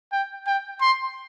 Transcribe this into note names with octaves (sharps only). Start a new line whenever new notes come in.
G5
G5
C6